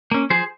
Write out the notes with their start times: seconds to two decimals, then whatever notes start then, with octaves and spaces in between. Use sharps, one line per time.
0.11 A#3 C#4
0.30 F3 G#4 C5